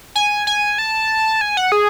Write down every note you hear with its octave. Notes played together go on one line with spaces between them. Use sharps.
G#5
G#5
A5
G#5
F#5
G#4